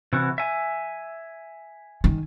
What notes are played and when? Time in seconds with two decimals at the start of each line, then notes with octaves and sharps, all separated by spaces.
0.13 C3 E3 F#4
0.38 E5 G#5
2.04 D#3